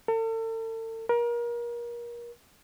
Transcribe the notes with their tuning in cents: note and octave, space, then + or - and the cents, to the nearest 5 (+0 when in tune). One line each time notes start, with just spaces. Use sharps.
A4 +40
A#4 +30